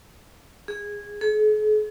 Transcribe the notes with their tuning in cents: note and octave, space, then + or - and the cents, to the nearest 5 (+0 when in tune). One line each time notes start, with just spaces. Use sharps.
G#4 -15
G#4 +45